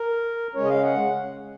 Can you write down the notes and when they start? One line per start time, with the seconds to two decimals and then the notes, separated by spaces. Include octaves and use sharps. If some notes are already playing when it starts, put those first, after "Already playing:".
Already playing: A#4
0.54 C#3 G#3 C#4 C#5
0.65 D#5
0.69 F5
0.84 F#5